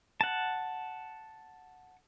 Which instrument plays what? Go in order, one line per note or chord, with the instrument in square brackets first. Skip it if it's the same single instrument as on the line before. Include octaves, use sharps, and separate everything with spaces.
[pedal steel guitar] F#5 A5